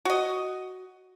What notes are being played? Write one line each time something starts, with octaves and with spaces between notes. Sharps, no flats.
F#4 D#5